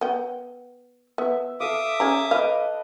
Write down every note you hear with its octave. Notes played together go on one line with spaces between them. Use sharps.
B3 G5
B3 E5
A4 E5 F5 D6 D#6
C#4 G#4 A#5
A4 B4 D#5 F5